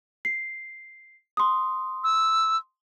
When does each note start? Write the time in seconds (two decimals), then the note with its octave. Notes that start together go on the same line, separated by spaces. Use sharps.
0.25 C7
1.37 C6 D#6
2.04 E6